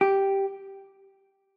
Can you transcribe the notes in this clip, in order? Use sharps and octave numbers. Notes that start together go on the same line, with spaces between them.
G4